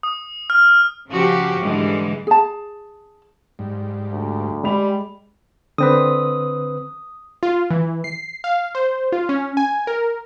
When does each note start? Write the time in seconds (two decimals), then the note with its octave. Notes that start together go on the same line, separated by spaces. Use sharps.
0.03 D#6
0.50 F6
1.09 C#3 F3 C#4 F#4 G4
1.62 G#2 D3 E3 G3 G#3
2.27 G#4 A5
3.59 G#2 G3
4.13 D2
4.64 G3 G#3 B5 F7
5.78 D3 C4 B4 D#6
7.43 F4
7.70 E3
8.04 C7
8.44 F5
8.75 C5
9.12 F4
9.29 C#4
9.57 G#5
9.87 A#4